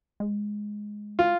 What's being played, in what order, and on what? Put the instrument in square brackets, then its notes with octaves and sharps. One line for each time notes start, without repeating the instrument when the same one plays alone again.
[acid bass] G#3
[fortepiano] F4